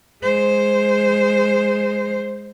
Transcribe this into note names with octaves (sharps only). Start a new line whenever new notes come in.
G#3 C5